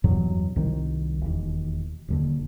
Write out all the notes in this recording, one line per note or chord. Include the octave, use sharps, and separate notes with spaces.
E2 G2 B2 F#3
C2 D#3
E1 D#2
D#1 D#2 D3